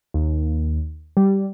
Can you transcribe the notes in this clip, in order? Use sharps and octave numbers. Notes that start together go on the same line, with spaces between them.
D#2
G3